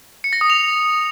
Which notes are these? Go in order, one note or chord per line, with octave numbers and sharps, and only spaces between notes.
C#7
A#6
D#6
F7